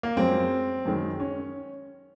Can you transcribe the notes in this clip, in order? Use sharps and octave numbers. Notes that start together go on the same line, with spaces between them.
A#3
F#2 F3 G#3 C4
F#2 D#3 G#3
C#4